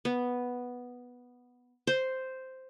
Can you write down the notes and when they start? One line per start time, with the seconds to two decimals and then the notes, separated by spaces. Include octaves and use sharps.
0.05 B3
1.87 C5